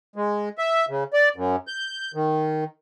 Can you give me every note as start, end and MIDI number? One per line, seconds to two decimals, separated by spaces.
0.16 0.49 56
0.58 0.85 76
0.89 1.04 49
1.13 1.29 74
1.36 1.56 42
1.67 2.12 91
2.14 2.64 51